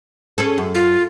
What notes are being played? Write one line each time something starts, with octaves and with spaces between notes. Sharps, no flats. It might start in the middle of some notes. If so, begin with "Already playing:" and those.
C#4 G#4 A4
F#2
F4